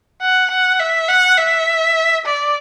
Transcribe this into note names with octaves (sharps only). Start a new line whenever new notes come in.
F#5
F#5
E5
F#5
E5
D5